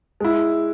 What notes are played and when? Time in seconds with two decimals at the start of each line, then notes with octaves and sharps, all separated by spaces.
0.20 G#3 E4